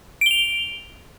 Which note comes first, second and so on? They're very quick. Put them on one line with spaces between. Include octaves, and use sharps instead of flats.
D7 G7 F7